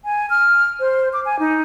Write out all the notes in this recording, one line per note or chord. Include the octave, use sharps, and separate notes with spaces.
G#5
F6
C5
D6
G#5
D#4